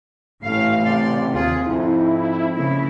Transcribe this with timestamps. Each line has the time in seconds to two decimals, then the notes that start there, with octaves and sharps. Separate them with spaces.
0.43 A1 A2 A3 F5
0.85 C3 D5 C6
1.34 D#2 F4 G#4
1.66 F2 G#2 E4
2.54 C#3 A#3 E4